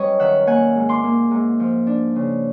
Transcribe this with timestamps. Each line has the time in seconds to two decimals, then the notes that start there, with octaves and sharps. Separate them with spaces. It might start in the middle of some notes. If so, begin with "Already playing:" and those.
Already playing: F#2 G3 B4 C#5 D#5
0.20 D#3 E5 F#5
0.47 A#3 F#5 G#5
0.76 G#2
0.89 C6 D6
1.04 A#3
1.31 G#2
1.60 F3
1.87 D4
2.16 C#3